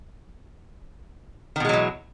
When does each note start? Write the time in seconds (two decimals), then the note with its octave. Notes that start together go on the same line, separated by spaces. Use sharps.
1.56 D#3
1.60 B2
1.65 G#3
1.69 F#3
1.73 E3